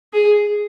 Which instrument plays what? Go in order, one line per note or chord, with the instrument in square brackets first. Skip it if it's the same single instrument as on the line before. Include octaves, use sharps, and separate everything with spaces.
[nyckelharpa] G#4